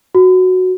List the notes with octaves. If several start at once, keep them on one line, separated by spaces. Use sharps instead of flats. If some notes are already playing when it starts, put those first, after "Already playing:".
F#4